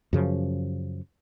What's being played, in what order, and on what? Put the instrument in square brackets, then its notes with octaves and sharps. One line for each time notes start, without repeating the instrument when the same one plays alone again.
[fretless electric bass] F#2 C#3 F3